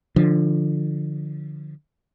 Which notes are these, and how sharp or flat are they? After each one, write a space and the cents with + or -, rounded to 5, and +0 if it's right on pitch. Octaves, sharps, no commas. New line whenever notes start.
D3 +20 F3 +0